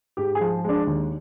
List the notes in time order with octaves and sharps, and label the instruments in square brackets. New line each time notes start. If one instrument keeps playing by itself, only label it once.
[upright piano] G#2 G4
G#4
F3
G#3 D4
D#2